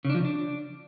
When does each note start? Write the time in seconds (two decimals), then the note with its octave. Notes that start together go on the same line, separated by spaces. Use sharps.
0.05 C#3
0.10 D4
0.15 F3
0.20 C#3
0.25 D4